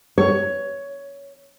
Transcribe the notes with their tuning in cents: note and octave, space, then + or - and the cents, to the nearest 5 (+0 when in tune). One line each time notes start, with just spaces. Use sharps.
C#5 +10